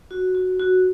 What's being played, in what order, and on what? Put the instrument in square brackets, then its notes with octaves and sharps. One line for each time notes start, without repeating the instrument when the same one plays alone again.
[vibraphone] F#4
F#4
F#4